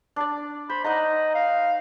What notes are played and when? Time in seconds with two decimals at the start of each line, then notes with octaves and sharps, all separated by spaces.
0.16 D4 D5
0.69 C5 B5
0.84 D#4 D#5 F#5 A#5
1.35 F5